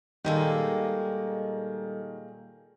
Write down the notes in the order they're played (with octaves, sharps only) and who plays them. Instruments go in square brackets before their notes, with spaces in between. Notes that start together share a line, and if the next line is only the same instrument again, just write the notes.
[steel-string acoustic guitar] A#2 G#3 A#3 [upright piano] D#3 [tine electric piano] G3 A4